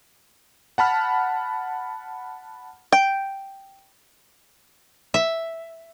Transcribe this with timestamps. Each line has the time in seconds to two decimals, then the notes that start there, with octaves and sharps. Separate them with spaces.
0.78 F#5 A5 B5 F6
2.92 G5
5.14 E5